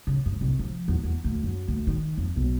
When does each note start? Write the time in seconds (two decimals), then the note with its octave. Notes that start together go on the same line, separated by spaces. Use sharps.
0.07 C#3
0.26 G2
0.41 C2
0.59 F3
0.88 E2
1.04 E2
1.24 D2
1.43 F#2
1.68 D2
1.87 D#3
2.17 F2
2.36 B1